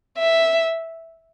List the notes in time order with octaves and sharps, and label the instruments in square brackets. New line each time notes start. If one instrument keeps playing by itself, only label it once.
[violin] E5